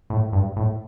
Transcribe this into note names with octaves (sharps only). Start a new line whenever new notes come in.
A2
G2
A2